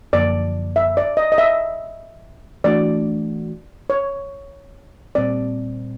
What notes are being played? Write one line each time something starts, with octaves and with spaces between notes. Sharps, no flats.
F#2 D3 F3 A#3 D5
E5
D5
D#5
D#5
E5
E3 A3 D4 F#4 D5
C#5
A#2 G3 C4 D5